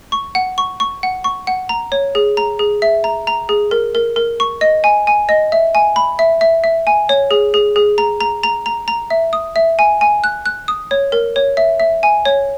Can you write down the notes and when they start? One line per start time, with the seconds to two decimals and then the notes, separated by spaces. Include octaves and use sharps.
0.12 C#6
0.35 F#5
0.58 C#6
0.80 C#6
1.03 F#5
1.24 C#6
1.47 F#5
1.69 A#5
1.92 C#5
2.15 G#4
2.37 A#5
2.59 G#4
2.82 E5
3.04 A#5
3.27 A#5
3.49 G#4
3.71 A#4
3.95 A#4
4.16 A#4
4.40 C#6
4.61 D#5
4.84 G#5
5.07 G#5
5.29 D#5
5.52 E5
5.75 G#5
5.96 B5
6.19 E5
6.41 E5
6.64 E5
6.87 G#5
7.09 C#5
7.31 G#4
7.54 G#4
7.76 G#4
7.98 A#5
8.21 A#5
8.44 A#5
8.66 A#5
8.88 A#5
9.10 E5
9.33 D#6
9.56 E5
9.79 G#5
10.01 G#5
10.24 F#6
10.46 F#6
10.68 D#6
10.91 C#5
11.12 A#4
11.36 C#5
11.57 E5
11.80 E5
12.03 G#5
12.25 C#5